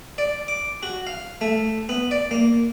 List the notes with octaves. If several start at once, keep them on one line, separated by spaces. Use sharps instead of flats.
D5
D6
F#4
F5
A3
B3
D5
A#3